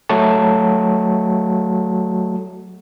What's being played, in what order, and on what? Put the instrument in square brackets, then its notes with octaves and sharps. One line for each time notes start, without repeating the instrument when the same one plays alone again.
[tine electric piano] F#3 A3 F#4 A5